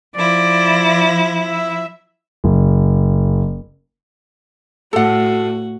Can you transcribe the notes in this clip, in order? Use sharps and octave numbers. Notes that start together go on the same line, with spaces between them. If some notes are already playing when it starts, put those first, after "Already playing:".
F3 E4 D5
E5
F#1
A2 F#4 A4 F#5